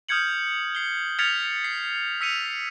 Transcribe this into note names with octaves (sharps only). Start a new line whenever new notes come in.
D#6 F6 G6 G#6 C#7 F#7
C7 G7
F6 G#6 A6 B6 C#7 F7
C7
E6 B6 C#7 D#7 F7